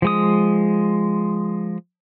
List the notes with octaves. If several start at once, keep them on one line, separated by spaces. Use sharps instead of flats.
F3 G#3 D#6